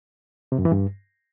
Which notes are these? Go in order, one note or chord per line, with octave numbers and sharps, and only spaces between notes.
C3
F#2
E3
G2